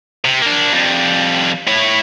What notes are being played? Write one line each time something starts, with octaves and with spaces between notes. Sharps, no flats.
C3
A#3 D4
F2 G3
E4 C#5